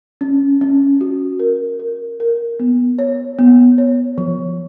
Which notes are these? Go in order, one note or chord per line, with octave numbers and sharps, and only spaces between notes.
C#4
C#4
F#4
A#4
A#4
A#4
B3
C#5
B3
C#5
F3